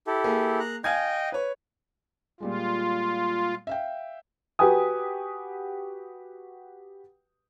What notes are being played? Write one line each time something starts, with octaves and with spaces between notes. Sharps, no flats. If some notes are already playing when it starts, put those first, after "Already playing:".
E4 G4 A4
A#3 G#4
A#5 F#6
D#5 F5 G5 G#5 G#6
B4 C#5
A#2 G3 G#3 F4
E5 F5 G5
F#4 G4 B4 G5 G#5 D#6